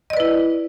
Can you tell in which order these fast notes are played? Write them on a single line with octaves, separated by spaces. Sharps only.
D#5 D5 B4 E4